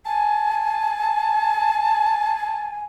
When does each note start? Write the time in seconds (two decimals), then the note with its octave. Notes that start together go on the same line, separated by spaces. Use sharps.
0.06 G#5 A5